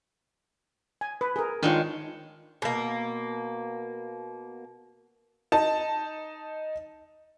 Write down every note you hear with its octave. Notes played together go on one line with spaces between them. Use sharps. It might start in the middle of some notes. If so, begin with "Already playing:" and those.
G#5
B4
G#4 A#4
D#3 G#3 D4 F4 C#5
B2 A#3
D#4 A5